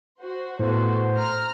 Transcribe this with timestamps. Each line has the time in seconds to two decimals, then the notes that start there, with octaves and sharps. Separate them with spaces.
0.20 F#4 C5
0.59 A2 B3 F#4 A4 C5
1.16 A#5 F6